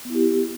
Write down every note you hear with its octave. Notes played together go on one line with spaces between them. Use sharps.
B3 E4 G4